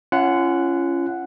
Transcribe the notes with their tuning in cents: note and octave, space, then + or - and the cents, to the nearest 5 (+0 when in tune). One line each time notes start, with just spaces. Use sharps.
C#4 +0 F4 -35 F#5 +0